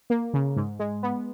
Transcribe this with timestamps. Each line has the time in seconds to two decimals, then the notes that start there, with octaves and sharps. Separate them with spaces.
0.10 A#3
0.34 C#3
0.56 G#2
0.79 G#3
1.03 B3